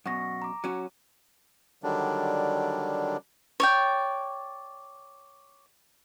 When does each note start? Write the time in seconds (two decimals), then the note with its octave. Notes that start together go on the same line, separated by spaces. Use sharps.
0.06 F#2 B2 F#5 C#6 A#6
0.42 A#5 D6
0.64 F#3 C#4 F#4
1.83 D3 D#3 F#3 G3 D4
3.60 C#5 D5 G5